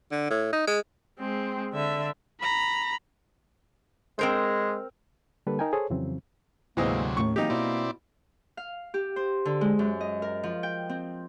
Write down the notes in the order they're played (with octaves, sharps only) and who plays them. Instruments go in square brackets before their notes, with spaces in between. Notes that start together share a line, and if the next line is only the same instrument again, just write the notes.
[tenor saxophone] D3
A2
D#4
G#3
[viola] G#3 C4
D3 E5
[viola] A#5 [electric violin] B5
[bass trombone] G#3 [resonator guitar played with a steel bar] C4 A#4 C5
[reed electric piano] D3 G3 A#3 A4 B4
D#4 A#4 G5 G#5
G#4 A4 C5 C#5
F2 C#3 E3 F#3 C4
[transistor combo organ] D2 C3 F#3 [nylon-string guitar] G#2 [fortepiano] E3 G#3 C4 [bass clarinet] A#3
[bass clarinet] D#2 [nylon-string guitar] A2 D#3 C#4 [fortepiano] C#6
[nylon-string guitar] E3 F#3 C4 [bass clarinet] A#3 [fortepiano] D#4 G4
[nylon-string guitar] B2 [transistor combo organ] C4 E4 D5
[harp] F5
G4
C5
D3
G#3
F#2
D#5
A#4
F3
G5
C4